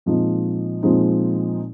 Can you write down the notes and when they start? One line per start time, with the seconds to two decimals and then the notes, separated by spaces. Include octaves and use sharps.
0.06 A#2 F3 G#3 C4 D#4
0.83 A#2 F3 G#3 C4 D#4